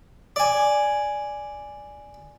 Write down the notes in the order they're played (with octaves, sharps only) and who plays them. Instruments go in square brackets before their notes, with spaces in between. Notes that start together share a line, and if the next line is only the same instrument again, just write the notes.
[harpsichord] D5 G#5